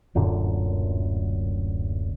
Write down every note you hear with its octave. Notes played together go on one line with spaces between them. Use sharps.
D1 F#2 A#2 D3